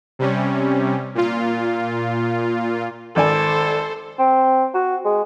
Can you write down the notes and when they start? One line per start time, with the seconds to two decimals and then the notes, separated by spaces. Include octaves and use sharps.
0.19 C3 G3 C#4
1.15 A#2 F4
3.16 G#1 A4 C5 D5 G#5
4.19 C4
4.74 F#4
5.05 G#3